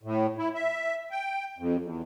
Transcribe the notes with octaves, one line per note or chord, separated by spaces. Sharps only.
A2
E4
E5
G5
F2
E2